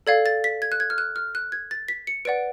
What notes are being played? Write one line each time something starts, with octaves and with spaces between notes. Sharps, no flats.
A4 D5 F5 G#6
A6
B6
G#6
F#6
G#6
F6
F#6
F6
F#6
G#6
A6
B6
C#7
B4 D5 F#5 D7